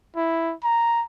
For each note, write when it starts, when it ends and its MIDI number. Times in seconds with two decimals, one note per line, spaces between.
0.16 0.53 64
0.63 1.04 82